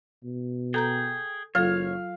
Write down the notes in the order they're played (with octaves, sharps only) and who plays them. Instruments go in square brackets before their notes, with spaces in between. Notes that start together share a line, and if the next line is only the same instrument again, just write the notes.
[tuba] B2
[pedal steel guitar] G#4 G5 [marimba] A4 A#5 G6
[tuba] F#1 [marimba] F#3 F4 A4 [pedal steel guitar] C#5 [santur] F5